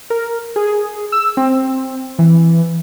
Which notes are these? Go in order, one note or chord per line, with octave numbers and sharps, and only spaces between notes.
A#4
G#4
E6
C4
E3